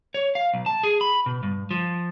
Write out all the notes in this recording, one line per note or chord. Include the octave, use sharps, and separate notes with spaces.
C#5
F5
B1
A5
G#4
B5
B2
G2
F3